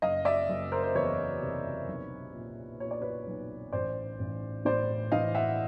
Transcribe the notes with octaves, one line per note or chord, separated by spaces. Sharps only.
F#1 D#5 F5
D5 E5
F#1
A#4 C5
C5
E2 B4 C#5
C3
B1
A#2
A#2 C#5
D5
B4 C#5
B1
A1 C5 D5
A1
A2 C5 D5
E3 D#5 F5
E5 F#5